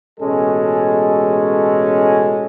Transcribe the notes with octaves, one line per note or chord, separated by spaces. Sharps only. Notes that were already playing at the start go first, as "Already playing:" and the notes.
A1 B2 G#3 C#4 A4